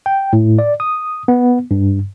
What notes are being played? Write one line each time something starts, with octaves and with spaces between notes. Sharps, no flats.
G5
A2
D5
D#6
B3
G2